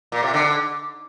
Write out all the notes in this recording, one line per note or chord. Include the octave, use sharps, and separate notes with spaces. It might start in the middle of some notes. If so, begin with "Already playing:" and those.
A#2
C3
D3